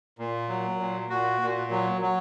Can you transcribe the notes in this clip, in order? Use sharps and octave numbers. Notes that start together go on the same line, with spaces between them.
A#2
F#3
A#2
A#2 F#4
A#2
F#3
F#3